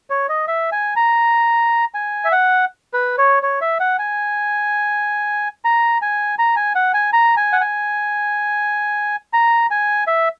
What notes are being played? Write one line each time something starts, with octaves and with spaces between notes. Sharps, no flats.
C#5
D#5
E5
G#5
A#5
G#5
E5
F#5
B4
C#5
C#5
E5
F#5
G#5
A#5
G#5
A#5
G#5
F#5
G#5
A#5
G#5
F#5
G#5
A#5
G#5
E5